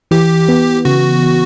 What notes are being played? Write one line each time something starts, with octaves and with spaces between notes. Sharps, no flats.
E3 G4
B3
C#3 F#4